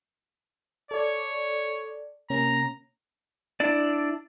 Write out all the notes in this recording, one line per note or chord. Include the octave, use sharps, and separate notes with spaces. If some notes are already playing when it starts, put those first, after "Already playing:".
A4 C#5 D5
C3 A#3 C#4 A#5
D4 E4 D5